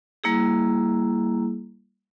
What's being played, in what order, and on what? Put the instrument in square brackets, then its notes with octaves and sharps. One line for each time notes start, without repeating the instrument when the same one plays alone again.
[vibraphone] G3 A#3 E4 G#4